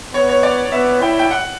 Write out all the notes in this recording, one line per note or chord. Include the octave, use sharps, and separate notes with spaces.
B3 C#5
C#5
D5
B3 E5
E4 G5
G5
F#5